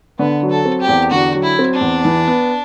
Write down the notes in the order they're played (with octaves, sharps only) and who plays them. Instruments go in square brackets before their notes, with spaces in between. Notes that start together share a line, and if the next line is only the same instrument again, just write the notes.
[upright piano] D3 [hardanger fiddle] B3
[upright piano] F#3
[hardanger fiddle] A4
[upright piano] C4
[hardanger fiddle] G4
[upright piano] E2
[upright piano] D3 [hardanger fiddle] F#4
[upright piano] F#3
[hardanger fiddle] E4
[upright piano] C4
[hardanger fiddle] D4
[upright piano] E2
E3
B3